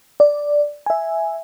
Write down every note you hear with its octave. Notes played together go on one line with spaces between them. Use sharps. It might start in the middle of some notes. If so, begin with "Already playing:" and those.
D5
E5 G#5